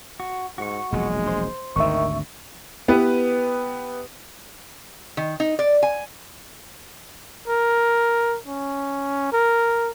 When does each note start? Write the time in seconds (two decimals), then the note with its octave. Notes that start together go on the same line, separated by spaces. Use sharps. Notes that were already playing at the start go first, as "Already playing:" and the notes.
0.20 F#4
0.58 G#2 F#4 C#6
0.92 E1 A#1 F#3 G#3
1.28 C5
1.76 G#1 D2 D3 D#3 E5 C#6
2.88 B3 E4 G4 B4
5.17 D#3
5.40 D#4
5.59 D5
5.83 G#5
7.48 A#4
8.47 C#4
9.32 A#4